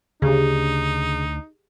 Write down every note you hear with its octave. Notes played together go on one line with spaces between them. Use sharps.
D2 C#3 D4 D#4 G4 G#4